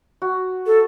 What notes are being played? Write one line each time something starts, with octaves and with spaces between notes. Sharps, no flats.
F#4
A4